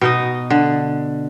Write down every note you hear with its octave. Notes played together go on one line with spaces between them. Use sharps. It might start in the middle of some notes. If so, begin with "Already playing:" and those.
B2 D#4 D#5
D3